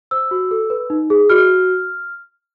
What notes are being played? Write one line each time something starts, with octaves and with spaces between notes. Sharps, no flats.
C5 E6
F#4
A4
B4
D#4
G#4
F#4 F6